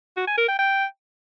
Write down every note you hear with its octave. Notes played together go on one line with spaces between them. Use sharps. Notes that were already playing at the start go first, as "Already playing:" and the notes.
F#4
G#5
A#4
G5
G5